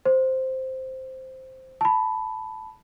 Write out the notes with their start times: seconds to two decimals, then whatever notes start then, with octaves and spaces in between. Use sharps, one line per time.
0.05 C5
1.81 A5 B5